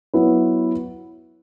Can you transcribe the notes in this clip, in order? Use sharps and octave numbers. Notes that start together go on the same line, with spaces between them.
F#3 B3 E4 B4